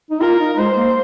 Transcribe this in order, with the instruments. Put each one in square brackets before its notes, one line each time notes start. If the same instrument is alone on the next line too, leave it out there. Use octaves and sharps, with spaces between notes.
[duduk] D#4
[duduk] F4 [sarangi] A#4
[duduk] D#4
[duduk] G#3 [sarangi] C5
[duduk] A#3